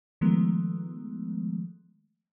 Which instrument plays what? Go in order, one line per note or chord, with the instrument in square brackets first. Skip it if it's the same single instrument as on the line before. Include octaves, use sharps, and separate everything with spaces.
[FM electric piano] D#3 F3 G#3 A3 B3